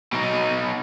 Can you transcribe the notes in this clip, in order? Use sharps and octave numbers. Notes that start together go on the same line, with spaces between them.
B2 D#4